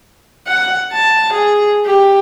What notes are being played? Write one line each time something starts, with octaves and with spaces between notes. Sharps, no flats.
F#5
A5
G#4
G4